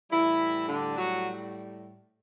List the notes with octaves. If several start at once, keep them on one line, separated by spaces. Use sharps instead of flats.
A2 E3 G3 E4
D3 D4
F#3 F#4